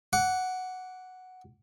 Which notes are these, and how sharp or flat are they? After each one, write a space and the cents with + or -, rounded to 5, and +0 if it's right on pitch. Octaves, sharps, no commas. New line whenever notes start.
F#5 +0 D6 -25